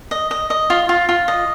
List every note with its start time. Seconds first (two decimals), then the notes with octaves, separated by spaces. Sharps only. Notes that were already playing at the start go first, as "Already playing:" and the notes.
0.11 D#5
0.31 D#5
0.50 D#5
0.70 F4
0.89 F4
1.09 F4
1.28 D#5